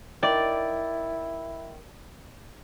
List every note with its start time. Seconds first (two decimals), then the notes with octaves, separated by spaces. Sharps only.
0.23 D#3 E4 D5